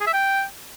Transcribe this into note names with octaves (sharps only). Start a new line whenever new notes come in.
G#4
E5
G5